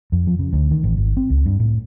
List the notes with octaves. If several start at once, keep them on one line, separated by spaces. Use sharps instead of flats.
F2
F3
C#3
D2
D#3
A1
G#1
C4
C#2
G2
A2